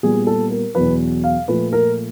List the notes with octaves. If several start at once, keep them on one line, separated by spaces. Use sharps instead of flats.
A#2 G3 B3 G#4
A4
A#4
E2 B2 F#3 B4
F5
A#2 F3 A3 B4
A#4